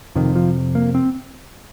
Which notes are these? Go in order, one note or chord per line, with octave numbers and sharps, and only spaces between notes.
F2 C3 D#3
F3
A#3
C4